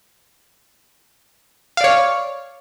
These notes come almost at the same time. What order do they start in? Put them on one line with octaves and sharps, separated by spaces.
F5 D5 C#5